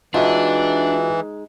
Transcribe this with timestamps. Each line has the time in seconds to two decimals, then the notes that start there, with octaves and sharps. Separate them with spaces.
0.14 E3 G#3 D4 D#4 F4 F#4 E5